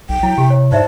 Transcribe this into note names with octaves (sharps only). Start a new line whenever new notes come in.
B1 G5
F#3 E4
C3 G4
C#5
G#2 C5 D5 E5 A5